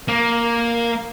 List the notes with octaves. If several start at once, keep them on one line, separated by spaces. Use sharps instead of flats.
A#3